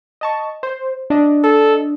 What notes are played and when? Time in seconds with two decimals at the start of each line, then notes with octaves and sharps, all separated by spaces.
0.21 D#5 A5 C#6
0.63 C5
1.10 D4 D#5
1.44 A4